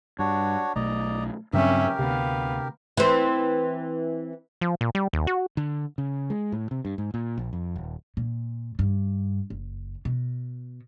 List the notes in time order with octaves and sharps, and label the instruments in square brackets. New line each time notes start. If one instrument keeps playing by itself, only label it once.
[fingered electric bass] G2 [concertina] D4 F#4 C#5
[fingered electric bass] B1 B2 A3 [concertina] D5 D#5 A#5
[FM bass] G2 [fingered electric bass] C#3 F#3 C4 [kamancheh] C#4 E5 [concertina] G4 A#4
[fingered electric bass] D2 [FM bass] C3 [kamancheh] B3 F5
[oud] E3 C4
[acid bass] F3
A#2
G3
D#2
F#4
[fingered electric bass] D3
C#3
G#3
A2
C3
G2
G#2
A#2
A#1
F2
D#1
[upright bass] A#2
G2
F#1
B2